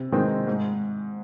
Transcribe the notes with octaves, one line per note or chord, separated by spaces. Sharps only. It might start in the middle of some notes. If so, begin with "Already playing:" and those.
Already playing: C3
D#3 G#3 C4 D#4
G#2